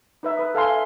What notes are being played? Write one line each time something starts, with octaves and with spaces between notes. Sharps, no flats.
D#4 B4 E5
B4 D#6
A4 F5 G#5 C6
E5